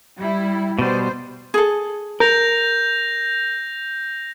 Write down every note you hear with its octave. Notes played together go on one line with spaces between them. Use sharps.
G3 E4
B2 G3 B3 C5
G#4 A4
A#4 G6 A#6 F7